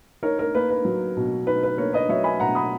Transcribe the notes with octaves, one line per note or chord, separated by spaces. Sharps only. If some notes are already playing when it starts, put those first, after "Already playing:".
D#4 A#4 C#5
A#4
A#3 B4
B4
F#3
B2
D#4 B4
B4
A#3 A#4 C#5
B4 D#5
F#3 C#5 E5
G#5 B5
B2 F#5 A#5
B5 D#6